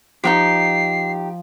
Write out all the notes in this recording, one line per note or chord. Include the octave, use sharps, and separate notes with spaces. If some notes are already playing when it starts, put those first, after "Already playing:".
F3 D#4 F#4 G4 C7